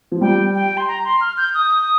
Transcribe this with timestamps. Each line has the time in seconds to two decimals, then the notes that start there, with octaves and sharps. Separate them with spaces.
0.12 F3
0.21 G3 G5
0.55 G5
0.77 C6
0.88 A#5
1.05 C6
1.21 F6
1.37 G6
1.54 D#6